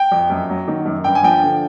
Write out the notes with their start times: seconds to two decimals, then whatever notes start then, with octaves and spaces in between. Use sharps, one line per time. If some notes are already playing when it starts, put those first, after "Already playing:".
Already playing: G5
0.12 F2
0.30 F#2
0.49 F#3
0.68 D#3
0.86 F#2
1.04 G2 G5
1.15 G#5
1.23 F3 G5
1.42 D3